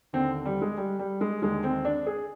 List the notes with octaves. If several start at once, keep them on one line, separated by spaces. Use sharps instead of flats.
D#2 D3 C4
G3
G#3
G3
G3
G#3
D#2 D3 G#3
C4
D4
G#4